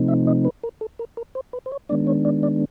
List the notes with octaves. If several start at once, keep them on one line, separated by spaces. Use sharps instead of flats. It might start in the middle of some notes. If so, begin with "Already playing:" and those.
Already playing: C3 F3 A3 C4 D#4
E5
D#5
B4
A#4
A4
A#4
A#4
C5
B4
C5
C#5
D#3 G#3 B3 D4 D5
C#5
D5
D5